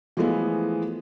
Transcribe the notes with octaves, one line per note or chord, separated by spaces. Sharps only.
E3 F3 G#3 A3 B3